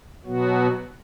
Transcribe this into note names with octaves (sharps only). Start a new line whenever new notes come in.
B2 F#3 B3 F#4